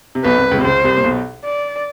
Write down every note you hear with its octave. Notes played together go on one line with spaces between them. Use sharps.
C3
B1 B2 B4
C2 C3
C#2 C#3
C3
C#2 C#3 C5
C2 C3
A#2
B1 B2
D5